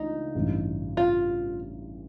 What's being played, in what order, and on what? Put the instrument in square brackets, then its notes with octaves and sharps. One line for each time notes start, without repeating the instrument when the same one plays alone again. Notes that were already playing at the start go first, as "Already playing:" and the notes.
Already playing: [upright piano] C#2 E3 A3 D4 [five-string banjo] D#4
[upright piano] A1 G2 E3
[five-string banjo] F4